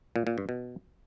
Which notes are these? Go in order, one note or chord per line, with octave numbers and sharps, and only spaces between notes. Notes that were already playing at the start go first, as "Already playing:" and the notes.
A#2
A#2
G2
B2